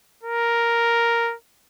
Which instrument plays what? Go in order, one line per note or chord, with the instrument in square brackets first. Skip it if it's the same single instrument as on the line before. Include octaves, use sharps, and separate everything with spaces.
[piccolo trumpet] A#4